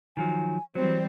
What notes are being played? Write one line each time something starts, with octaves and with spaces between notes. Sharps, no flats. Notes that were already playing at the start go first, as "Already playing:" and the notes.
D#3 F3 F#3 G#5
E3 F#3 G3 C4 C5